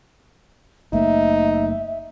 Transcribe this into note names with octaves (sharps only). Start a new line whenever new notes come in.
F#1 A3 A#3 D#4 E5